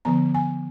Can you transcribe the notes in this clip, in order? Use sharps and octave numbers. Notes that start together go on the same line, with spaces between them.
D3 F3 B3 A#5
G#5